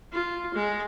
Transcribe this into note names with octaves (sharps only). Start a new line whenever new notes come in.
F4
G#3